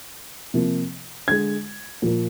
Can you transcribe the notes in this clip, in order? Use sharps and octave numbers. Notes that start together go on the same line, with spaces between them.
C3 F3 A#3
D3 G#3 G#6
A#2 F3 A#3